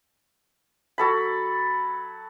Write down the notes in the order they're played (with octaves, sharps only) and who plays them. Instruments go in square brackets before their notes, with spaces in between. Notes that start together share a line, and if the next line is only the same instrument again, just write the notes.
[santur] F#3 A4 B5